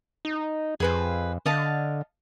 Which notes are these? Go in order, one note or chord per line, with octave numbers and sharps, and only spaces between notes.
D#4
F2 G#4 B4 C5
D3 D#5 F5 A5